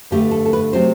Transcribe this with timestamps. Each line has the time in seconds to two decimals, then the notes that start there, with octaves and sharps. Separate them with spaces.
0.11 G2 D3 A3 G4
0.31 A4
0.46 A4
0.53 B4
0.73 C3 F#3 A3 C4 C5